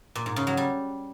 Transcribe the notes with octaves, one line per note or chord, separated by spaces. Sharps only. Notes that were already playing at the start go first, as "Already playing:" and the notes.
A#2
G#2
C#3
F#3
G3